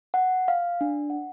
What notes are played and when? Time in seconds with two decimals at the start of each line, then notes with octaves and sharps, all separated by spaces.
0.14 F#5
0.48 F5
0.81 D4
1.10 F#5